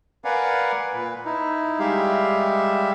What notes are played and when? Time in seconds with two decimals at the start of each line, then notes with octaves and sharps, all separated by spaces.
0.25 A#4 B4 D5 F5 F#5 G#5
0.93 A#2 B4
1.25 D#4 E4
1.79 G3 G#3 G4 E5 F5